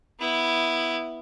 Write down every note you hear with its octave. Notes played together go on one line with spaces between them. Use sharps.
B3 E4